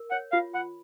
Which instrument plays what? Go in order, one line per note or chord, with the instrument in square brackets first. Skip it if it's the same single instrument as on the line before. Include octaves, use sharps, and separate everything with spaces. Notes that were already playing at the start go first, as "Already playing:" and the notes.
Already playing: [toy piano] A#4
[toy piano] C#5 [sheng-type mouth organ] F#5
[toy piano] F4 [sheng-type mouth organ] F5
[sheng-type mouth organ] F#5 [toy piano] B5